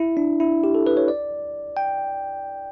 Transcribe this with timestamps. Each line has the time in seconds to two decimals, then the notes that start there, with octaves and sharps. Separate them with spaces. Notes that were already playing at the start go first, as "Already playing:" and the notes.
Already playing: E4
0.17 D4
0.40 E4
0.64 G4
0.75 A4
0.87 B4
0.97 C#5
1.08 D5
1.77 G5